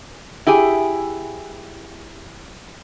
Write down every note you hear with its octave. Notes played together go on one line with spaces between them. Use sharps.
E4 G4 G#4 G#5